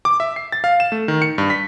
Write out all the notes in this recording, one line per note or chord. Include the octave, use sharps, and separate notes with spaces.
D6
E5
C7
A6
F5
E7
A3
D#3
C#7
G2
B6